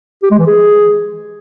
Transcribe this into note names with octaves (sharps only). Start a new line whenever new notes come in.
G4
G#3
E3
G#4